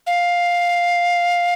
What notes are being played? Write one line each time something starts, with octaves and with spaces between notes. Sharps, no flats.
F5